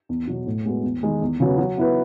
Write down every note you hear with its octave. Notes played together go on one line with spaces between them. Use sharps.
E2
B2 F#3
A2
G#3 B3 F#4
E2
D#3 G#3 D#4 G#4
E2
C#3 F#3 B3
F#3
B3 E4 B4